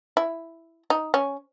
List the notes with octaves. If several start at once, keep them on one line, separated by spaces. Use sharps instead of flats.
E4
D#4
C#4